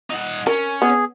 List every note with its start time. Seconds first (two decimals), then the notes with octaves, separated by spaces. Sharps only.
0.10 D#4 F#5
0.47 C#4 A#4
0.82 B3 G#4